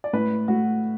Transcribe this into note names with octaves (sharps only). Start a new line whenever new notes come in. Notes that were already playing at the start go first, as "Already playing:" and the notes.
D5
A2 B4
A3 F#4